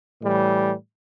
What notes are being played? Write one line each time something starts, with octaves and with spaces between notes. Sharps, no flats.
A2 E3 G3